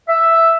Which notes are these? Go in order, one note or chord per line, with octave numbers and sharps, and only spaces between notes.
E5